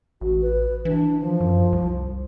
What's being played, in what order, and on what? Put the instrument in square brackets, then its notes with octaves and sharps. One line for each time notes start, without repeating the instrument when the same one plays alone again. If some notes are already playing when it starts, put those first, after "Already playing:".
[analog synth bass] A1 [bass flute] F#4
[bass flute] B4
[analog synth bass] E3 [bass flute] D4
[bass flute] F3
[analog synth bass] F#2
C2